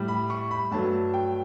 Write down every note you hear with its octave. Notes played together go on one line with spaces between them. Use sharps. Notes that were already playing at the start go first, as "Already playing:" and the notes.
Already playing: A2 G3
B5
C#6
B5
G2 F#3 A3 A5
G5